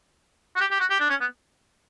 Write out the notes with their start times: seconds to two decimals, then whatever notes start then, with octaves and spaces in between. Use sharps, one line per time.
0.56 F#4
0.61 G4
0.71 G4
0.80 F#4
0.90 G4
1.00 D4
1.10 C#4
1.21 B3